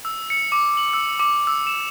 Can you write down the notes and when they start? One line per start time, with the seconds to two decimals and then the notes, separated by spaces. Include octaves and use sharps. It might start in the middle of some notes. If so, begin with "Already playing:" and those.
0.05 E6
0.30 C#7
0.52 D6
0.77 F#7
0.94 E6
1.20 D6
1.47 E6
1.67 E7